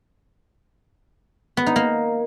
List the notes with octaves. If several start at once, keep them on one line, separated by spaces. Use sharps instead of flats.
B3
D#4
A#3